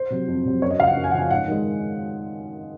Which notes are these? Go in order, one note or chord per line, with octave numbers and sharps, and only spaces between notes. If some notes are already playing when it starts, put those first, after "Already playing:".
Already playing: C5
C3 F#3
F2
C3 F#3
F#2 C#5
D#5
C#3 F3 F5
F#5
F#2
G#5
F#5
C#3 F3 G#5
G#2 F#5
D#3 G#3